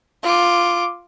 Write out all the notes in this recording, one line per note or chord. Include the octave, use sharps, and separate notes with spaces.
F4 D6